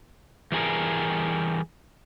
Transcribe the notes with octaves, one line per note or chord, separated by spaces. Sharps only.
E3 G3 G#4 A#4